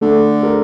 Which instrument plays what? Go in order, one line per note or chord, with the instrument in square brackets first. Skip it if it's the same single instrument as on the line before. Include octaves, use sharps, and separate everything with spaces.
[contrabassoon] D3 [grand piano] A3
[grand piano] A#4